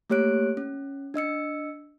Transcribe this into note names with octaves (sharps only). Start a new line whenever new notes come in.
A3 A#3 G4 C#5 F#6 D7
C#4
D4 D#5 E6 C#7